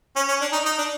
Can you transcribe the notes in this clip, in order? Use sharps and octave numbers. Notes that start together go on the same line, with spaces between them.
C#4
C#4
D4
D#4
D#4
D4